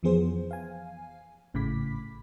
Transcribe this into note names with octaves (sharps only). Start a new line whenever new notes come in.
F2 E3 F3 B3 G#4 C5
F5 G#5
G#1 A2 C#3 B5 D6 B6